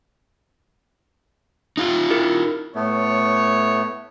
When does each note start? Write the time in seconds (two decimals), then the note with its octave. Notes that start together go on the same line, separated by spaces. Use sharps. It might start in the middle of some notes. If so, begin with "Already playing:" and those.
1.77 D#4 F4
2.10 E4 G4 A#4
2.75 A2 A3 B3 C#5